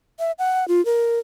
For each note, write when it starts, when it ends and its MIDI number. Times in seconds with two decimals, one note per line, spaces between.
0.19 0.32 76
0.39 0.67 78
0.68 0.84 65
0.85 1.19 70